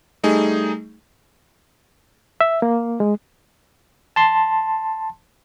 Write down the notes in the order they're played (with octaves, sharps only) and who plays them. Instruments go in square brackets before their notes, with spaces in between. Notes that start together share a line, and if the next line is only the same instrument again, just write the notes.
[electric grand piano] G3 A3 D#4 G#4
[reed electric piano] E5
A#3
G#3
[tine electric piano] A5 C6